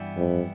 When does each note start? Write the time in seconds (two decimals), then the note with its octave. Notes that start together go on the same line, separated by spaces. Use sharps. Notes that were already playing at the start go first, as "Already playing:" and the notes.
Already playing: G2 E3 G3 B3 E4
0.17 F2